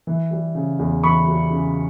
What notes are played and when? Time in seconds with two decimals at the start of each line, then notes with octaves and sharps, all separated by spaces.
0.07 E3
0.31 G3
0.55 C#3
0.79 E2
1.03 E3 B5 C#6
1.27 G3
1.51 C#3